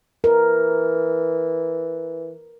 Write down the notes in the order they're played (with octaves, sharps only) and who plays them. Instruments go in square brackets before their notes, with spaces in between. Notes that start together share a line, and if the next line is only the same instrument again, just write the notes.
[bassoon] E3 [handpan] A#4